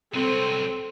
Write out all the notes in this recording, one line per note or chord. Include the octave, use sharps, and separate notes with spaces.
C2 F#3 C4 A4